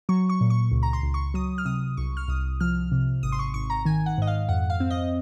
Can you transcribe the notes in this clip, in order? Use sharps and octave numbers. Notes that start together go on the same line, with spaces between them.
F#3 C#6
C#6
A#2
C#6
C#2
A#5
C6
C#2
C#6
F#3 D#6
F6
C3 D#6
C2 C#6
F6
C2 D#6
F3 F6
C3
G#1 D#6
C6
C#6
G#1 C#6
A#5
D#3 G#5
F#5
G#2 D#5
F5
F2 F#5
F5
C4
D#5